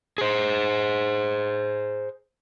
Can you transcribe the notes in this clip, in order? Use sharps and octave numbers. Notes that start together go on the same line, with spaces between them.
G#4 C5